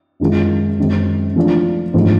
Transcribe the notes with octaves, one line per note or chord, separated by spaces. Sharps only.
F#2 D#3 G#3 C#4 F4
F#2 D#3 G#3 C4
F3 A3 D4 F4
G#2 F3 A3 D4